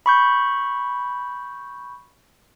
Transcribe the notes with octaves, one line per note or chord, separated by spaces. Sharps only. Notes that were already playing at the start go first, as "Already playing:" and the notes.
B5 C#6 G6